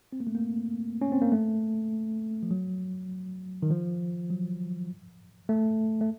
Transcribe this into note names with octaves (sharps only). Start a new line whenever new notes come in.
C4
A#3
A3
A#3
C#4
C4
A#3
A3
F3
F#3
D#3
F3
F#3
A3
A3